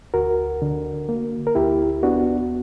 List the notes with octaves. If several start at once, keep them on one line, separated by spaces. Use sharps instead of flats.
D2 F#4 A#4
D3
A#3
A#4
D2 E4 G4
B3 D4 F#4